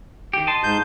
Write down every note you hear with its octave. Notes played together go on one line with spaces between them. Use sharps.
D#3 G4
D#5 A5 C6
G#2 G6